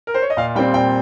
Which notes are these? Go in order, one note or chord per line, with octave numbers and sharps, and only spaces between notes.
A#4
C5
C#5
D#5
A#2 F5
G3 C4 G5
A#2 G5